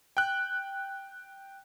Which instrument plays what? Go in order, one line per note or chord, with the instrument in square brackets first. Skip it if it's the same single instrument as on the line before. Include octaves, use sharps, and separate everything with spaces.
[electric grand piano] G5 F#6